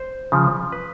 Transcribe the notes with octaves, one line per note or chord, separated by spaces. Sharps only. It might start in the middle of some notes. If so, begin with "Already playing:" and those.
Already playing: C5
C#3 F3
B4